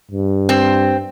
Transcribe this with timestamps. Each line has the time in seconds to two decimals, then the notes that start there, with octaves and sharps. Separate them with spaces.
0.11 G2
0.49 C4